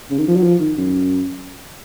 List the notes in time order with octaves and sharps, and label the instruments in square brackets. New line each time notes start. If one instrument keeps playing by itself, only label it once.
[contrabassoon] C#3
D#3
F3
F#3
F3
D#3
F#2